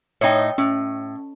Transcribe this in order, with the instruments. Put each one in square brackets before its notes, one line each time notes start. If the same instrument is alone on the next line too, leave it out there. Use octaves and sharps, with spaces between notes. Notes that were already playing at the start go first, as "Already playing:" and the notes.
[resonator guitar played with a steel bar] A2 D#4 [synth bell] C#5 G5
[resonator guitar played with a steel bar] A2 [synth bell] C#4